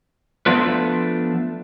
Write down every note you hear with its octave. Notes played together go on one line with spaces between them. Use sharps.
F3 A3 B3 D4 F4 B4